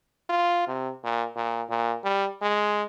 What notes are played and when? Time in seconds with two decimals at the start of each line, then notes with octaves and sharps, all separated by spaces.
0.29 F4
0.68 C3
1.04 A#2
1.36 A#2
1.70 A#2
2.04 G3
2.42 G#3